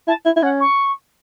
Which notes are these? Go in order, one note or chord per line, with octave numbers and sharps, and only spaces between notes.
E4 A5
E4
E4
C#4 F#5
C#6